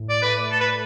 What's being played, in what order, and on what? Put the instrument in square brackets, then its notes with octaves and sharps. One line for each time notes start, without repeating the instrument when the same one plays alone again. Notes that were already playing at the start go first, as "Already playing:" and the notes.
Already playing: [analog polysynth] A2
[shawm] D5
[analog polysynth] A3 [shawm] B4
[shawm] A4
[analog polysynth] A2 [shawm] B4